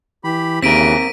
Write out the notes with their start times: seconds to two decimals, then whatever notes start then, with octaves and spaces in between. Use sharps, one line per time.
0.24 E3 G4 B5
0.62 D#2 C#3 E3 C4 A#4 B6 D7 D#7